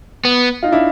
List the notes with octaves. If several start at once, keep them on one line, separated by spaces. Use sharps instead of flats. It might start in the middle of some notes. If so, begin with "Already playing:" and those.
B3
D#4 F4
D4 E4